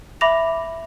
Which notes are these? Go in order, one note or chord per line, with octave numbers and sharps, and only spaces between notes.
E5 B5 D6 A#6 F7